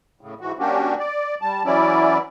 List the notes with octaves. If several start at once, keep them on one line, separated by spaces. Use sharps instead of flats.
A2 C#3
G#2 E3 F#4
F#3 A#3 C#4 D4 F#4 G4
D5
G3 A5
E3 F#3 C#4 E4 D5